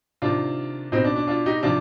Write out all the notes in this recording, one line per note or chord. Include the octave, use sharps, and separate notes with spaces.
C3 D#3 D4 F4
B2 C4 D#4
D4
D4
D4 F4
D#4 G4
C3 F3 D4 F4